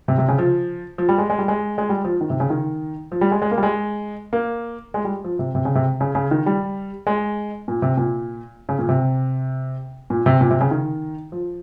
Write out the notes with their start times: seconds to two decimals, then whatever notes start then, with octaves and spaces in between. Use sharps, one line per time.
0.08 C3
0.18 C3
0.28 C#3
0.38 F3
0.98 F3
1.09 G3
1.18 G#3
1.30 G#3
1.38 G3
1.48 G#3
1.78 G#3
1.89 G3
2.04 F3
2.21 D#3
2.30 C3
2.40 C#3
2.50 D#3
3.12 F3
3.21 G3
3.32 G#3
3.42 G#3
3.51 A#3
3.58 G3
3.63 G#3
4.33 A#3
4.94 G#3
5.04 G3
5.24 F3
5.39 C3
5.55 C3
5.65 C#3
5.75 C3
6.01 C#3
6.15 C#3
6.31 D#3
6.46 G3
7.07 G#3
7.68 A#2
7.82 C3
7.97 A#2
8.69 C#3
8.79 A#2
8.89 C3
10.10 A#2
10.26 C3
10.41 A#2
10.51 C3
10.61 C#3
10.71 D#3
11.32 F3